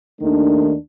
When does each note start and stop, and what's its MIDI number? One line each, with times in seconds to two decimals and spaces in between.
0.22 0.74 39
0.22 0.74 51
0.22 0.74 57
0.22 0.74 62